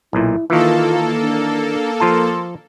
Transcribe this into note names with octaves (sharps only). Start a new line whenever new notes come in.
B1 A#2 E4
D#3 E3 A#3 F4 A4
D4
F3 F4 A5 C6